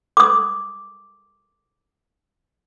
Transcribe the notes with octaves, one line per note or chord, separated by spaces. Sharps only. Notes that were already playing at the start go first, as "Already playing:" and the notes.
D6 D#6